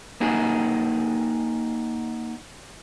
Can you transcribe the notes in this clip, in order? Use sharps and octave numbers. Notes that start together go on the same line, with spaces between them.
A#3 D#4 F#4 G#4